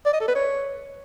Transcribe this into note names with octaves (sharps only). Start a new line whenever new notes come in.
D5
D#5
A4
B4
C#5